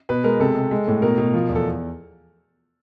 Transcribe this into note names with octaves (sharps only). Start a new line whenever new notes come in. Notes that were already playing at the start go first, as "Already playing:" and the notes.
B2 B4
G#3 A#4
C3 A4
C3
G#3
A2
B2 A#4
B2
F3
E2
A4